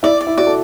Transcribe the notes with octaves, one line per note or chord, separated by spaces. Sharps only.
E4 D5
D5
E4
F#4 D5
A4